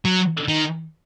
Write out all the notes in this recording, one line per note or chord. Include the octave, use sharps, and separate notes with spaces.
F#3
D#3